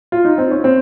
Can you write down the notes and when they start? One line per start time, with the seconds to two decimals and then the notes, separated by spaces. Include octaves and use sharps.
0.12 F4
0.25 D#4
0.38 C4
0.51 C#4
0.64 C4